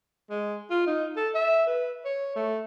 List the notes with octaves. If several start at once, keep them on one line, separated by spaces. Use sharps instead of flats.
G#3
F4
D#4
A4
E5
B4
C#5
A3